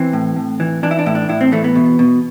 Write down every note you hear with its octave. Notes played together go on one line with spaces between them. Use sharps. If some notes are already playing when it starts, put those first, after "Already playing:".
Already playing: E3 C4
A2
A2
E3
E3 D4
E4
D4
A2 E4
D4
A2 E4
C4
E3 A3
B3
B2
B2